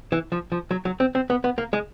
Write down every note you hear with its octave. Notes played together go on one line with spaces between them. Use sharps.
E3
F3
F3
F#3
F#3
C4
C4
B3
B3
A#3
G#3